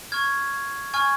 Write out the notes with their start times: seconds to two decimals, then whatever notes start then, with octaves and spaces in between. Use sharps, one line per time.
0.12 C#6 F6 G#6
0.94 G#5 C#6 F6 G#6